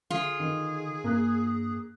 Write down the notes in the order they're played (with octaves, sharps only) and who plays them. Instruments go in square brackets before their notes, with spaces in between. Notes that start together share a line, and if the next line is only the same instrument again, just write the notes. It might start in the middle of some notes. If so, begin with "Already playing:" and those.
[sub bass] D3 [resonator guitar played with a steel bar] F4 [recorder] G#4
[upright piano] D#3
[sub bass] G2 [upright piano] A#3 F#6